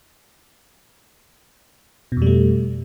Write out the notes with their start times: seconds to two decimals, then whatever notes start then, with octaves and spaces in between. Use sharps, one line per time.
2.12 B2
2.17 F2
2.22 G3
2.27 A3